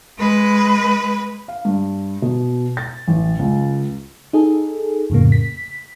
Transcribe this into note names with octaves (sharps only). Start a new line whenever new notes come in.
G#3 B4
F5
G2
B2
A6
A1
C#2
D#4 G#4 A4
F2 A2 C#3 A#3
B6